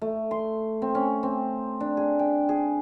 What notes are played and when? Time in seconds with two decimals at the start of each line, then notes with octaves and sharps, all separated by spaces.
0.02 A3
0.31 C6
0.82 C4
0.95 C#4
1.23 C4
1.80 D4
1.97 G#4
2.19 G5
2.49 G#4